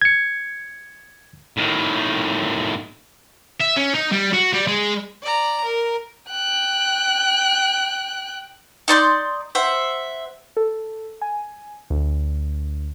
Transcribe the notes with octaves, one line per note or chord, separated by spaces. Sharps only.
G#6 C#7
A2 D#3
E5
C#4
D#4
G3
F#4
G3
G#3
D5 A#5
A#4
G5 F#6
D#4 D5 C6 G6
C5 E5 F#5
A4
G#5
D2